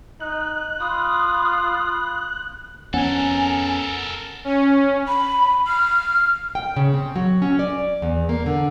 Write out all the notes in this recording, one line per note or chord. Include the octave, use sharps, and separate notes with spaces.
D#4 F#6
F4 B5 D#6
F2 B3 C#4 A4 A#4 F#5 G#5
C#4
B5
F6
G5
C#3
C4
F#3
C#4
D5
E2
A#3
D3